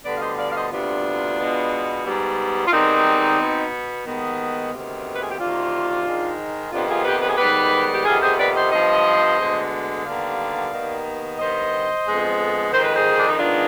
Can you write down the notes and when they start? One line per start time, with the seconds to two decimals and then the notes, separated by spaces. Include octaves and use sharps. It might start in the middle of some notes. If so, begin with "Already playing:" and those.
0.05 D2 D3 G3 B3 B4 D5
0.17 F5
0.21 C5 D#5
0.38 D5 F5
0.51 F5
0.55 C5 D#5
0.71 D2 C3 G3 B3 D4 F4
1.38 B2 G#3 B3
2.05 G#2 G3 B3
2.67 F4
2.72 G#2 D#3 G3 B3 C4 D#4
3.39 B2 B3
4.06 D#2 D#3 G#3 B3
4.72 D2 C3 D#3 B3
5.15 B4
5.23 G#4
5.31 G4
5.39 D2 C3 D#3 D4 F4
6.06 G#2 D#3 G#3
6.72 F2 C3 D#3 B3 D4 F4
6.89 F4 G#4
7.05 G4 B4
7.22 B4
7.30 G#4
7.37 G#2 D#3 G3 B3 G4 B4
7.94 G4
8.05 F2 C3 D#3 B3 F4 G#4
8.22 G#4 C5
8.39 B4 D5
8.56 C5 D#5
8.72 G2 F3 B3 C5 D#5
9.39 D2 D3 G#3 B3
10.06 D#2 D3 G3 B3 D5 F5
10.73 D#2 D#3 B3
11.39 G2 D#3 B3 C5 D#5
12.06 F2 D3 G#3 B3
12.73 F2 D#3 G#3 C5
12.84 B4
12.95 G#4 C5
13.18 D4
13.29 D#4
13.39 G#2 D#3 G#3 B3 D4 F4